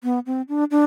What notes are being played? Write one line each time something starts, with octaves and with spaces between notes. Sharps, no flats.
B3
C4
D4
D4